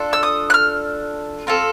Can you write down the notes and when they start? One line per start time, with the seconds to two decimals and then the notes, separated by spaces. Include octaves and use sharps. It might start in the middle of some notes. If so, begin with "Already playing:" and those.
Already playing: D4 F4 A4
0.13 E6
0.23 D#6
0.50 F#6
0.54 F6
1.47 C4 F4 A4